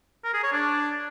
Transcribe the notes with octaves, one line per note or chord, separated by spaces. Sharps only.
A#4
G#4
C#5
D4